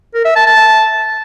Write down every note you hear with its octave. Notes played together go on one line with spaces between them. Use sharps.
A#4
E5
A5
A5